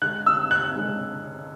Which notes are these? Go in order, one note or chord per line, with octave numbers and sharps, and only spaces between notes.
D3 G#3 F#6
E6
F#6
D3 G#3